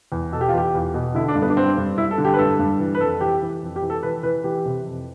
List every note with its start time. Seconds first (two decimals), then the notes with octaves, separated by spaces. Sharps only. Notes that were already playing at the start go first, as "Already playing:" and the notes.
0.12 E2
0.32 B2 A4
0.41 G4
0.48 F4
0.54 E2 G4
0.74 E2
0.94 B2
1.15 D3 E4
1.28 D4
1.35 G2
1.42 B3
1.50 D4
1.57 G2 C4
1.78 G2
1.97 G2 E4
2.11 A4
2.18 D3
2.25 G4
2.34 B4
2.39 G2 A4
2.59 G2
2.79 E3
2.95 B4
3.01 F2 A4
3.21 E3 G4
3.42 E3
3.63 F2
3.76 G4
3.82 E3
3.90 A4
4.03 E3 B4
4.23 E3 B4
4.44 E3 G4
4.65 C3
4.85 F2